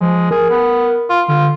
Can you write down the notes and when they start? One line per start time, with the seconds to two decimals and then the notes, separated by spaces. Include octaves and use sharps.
0.01 F3 G#3
0.31 G#4 A#4
0.50 B3
1.09 F4
1.28 D3 F4